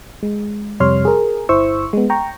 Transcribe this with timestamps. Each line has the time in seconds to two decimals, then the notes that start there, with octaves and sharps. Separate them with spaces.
0.23 G#3
0.80 F2 C3 G3 C#5 C6 F6
1.05 G#4 A#4
1.49 G1 E4 C5 C#6 E6
1.93 G#3 B3
2.10 G5 A#5 C#6